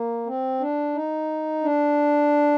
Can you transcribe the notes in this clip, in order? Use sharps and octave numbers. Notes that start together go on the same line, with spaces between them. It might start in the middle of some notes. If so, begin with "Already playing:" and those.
Already playing: A#3
C4
D4
D#4
D4